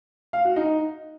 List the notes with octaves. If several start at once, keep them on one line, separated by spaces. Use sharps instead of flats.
F5
F#4
D#4